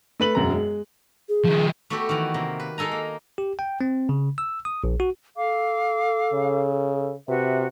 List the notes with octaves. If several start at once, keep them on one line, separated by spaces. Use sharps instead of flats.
A3 B4 F#7
E1 F#2 A#5
G#3
G#4
D#3 F3
A3 B3 F#4 G4 A4
D#3 E3
C3 A#3
B4
G#3 D#4 A4 G#5 A#5
A#3
G4
G5
C4
C#3
E6
D#6
A#1
F#4
A4 F5 D6
C#3
C3 F#4 B4 E5